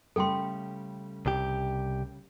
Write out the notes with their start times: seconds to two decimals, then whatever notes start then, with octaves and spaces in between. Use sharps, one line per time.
0.16 C#3 G3 A3 A4 G5 C6
1.26 C2 G4